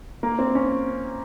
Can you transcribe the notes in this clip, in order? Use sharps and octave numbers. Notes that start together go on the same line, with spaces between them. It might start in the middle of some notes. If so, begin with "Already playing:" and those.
A#3
C4
C#4